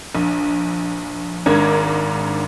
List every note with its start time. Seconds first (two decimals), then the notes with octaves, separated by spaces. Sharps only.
0.15 A#1
1.46 G#1 G#2 D4 A#4 G#6